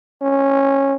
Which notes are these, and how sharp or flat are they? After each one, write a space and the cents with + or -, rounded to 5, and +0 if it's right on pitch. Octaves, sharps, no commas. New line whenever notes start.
C#4 -15